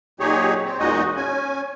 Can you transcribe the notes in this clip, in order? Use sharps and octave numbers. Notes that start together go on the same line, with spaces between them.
A#2 F#3 D#4 G4 G#4 C#5
C4
E2 A#2 G#3 D#4 F#4 D#5
C#4 G#5